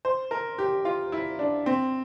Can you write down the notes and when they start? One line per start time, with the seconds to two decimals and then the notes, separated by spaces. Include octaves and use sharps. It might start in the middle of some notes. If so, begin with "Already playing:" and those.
0.05 C5
0.31 A#4
0.58 G4
0.85 F4
1.12 E4
1.39 D4
1.66 C4